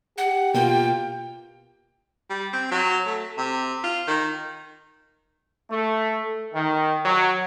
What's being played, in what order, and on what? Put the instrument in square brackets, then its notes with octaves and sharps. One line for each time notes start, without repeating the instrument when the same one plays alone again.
[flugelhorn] G4 [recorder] F#5
[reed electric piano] B2 [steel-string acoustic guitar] A#3 F4 [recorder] G5
[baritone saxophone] G3
C4
F#3
A3
C3
F4
D#3
[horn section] A3
D#3
F#3